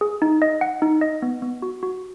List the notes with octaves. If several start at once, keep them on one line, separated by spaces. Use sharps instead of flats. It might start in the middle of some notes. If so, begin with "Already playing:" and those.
G#4
D#4
D#5
F#5
D#4
D#5
B3
B3
F#4
F#4